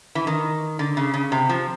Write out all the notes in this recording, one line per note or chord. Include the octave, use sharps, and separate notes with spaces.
E3
D#3
D3
C#3
C#3
C3
F3